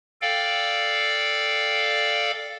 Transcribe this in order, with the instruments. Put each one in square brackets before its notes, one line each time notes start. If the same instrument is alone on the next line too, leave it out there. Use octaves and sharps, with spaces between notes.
[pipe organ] A4 D5 F5 G5